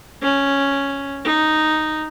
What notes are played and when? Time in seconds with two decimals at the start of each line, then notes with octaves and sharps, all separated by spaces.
0.22 C#4
1.24 D#4